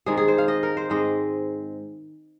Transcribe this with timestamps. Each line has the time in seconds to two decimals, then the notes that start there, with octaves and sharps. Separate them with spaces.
0.06 D#3 G#3 C4 G#4
0.17 G#4
0.28 C5
0.38 F5
0.48 D#5
0.63 A#4
0.77 C5
0.90 G#2 G#3 C4 D#5